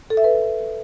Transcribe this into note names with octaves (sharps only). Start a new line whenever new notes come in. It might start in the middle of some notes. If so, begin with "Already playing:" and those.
A4
E5
B4